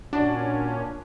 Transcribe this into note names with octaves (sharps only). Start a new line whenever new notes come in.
A#2 C#4 D4 F#4 D5